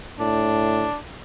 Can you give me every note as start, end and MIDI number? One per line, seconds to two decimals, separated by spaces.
0.19 0.87 45
0.19 0.97 62